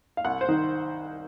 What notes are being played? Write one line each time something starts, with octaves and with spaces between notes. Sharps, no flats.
F5
C2 F#5
C5
D#3